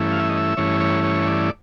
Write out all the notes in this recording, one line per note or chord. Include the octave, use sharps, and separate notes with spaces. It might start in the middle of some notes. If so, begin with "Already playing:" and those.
Already playing: G2 E3 A3 C#4 E4
F5
E5
D#5
E5
G2 E3 A3 C#4 E4 C#5
C#5
C#5
D5